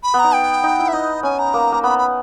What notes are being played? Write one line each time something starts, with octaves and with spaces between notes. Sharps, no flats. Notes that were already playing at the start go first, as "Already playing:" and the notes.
B5
B3
D#4 A#5
G5
D#4
E4
E5
D#4 D#5
C#4 G#5
A#5
A#3
A#3
B3 B5
B5